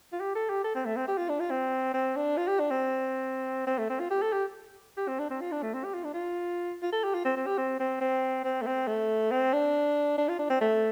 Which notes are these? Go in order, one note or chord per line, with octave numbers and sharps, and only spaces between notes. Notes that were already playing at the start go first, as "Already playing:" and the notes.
F4
G4
A4
G4
A4
C4
A3
C4
G4
F4
D4
F4
C4
C4
D4
F4
G4
D4
C4
C4
A3
C4
F4
G4
A4
G4
G4
C4
D4
C4
F4
D4
A3
C4
G4
F4
D4
F4
F4
A4
G4
F4
C4
C4
G4
C4
C4
C4
C4
A3
C4
A3
C4
D4
D4
F4
D4
C4
A3